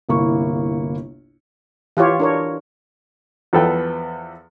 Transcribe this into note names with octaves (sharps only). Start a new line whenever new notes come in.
G1 C2 A#3 E4 C#6
E3 F4 G4 C#5
D4 A#4 C#5
E2 F3 B3 A4 B4 G5